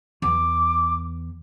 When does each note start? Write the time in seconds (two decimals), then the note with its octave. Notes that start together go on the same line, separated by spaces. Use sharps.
0.22 E2 D6